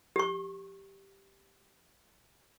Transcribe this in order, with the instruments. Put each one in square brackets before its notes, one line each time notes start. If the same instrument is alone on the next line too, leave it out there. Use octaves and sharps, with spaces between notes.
[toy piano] G4 C#6